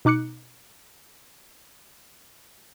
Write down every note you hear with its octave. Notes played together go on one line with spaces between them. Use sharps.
B2 D#4 D6 F#6 C#7